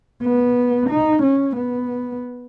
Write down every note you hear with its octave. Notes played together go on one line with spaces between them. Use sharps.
B3
D#4
C#4
B3